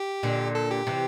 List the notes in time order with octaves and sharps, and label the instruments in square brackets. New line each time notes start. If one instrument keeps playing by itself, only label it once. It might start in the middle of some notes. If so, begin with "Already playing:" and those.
Already playing: [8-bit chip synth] G4
[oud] A#2 D3
[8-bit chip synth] A4
G4
[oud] C3 E3